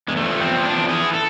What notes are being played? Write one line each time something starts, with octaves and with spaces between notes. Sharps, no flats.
E2 G#3
A3
F3
E2 C4
F3
D4
E2
E3 G#4
A4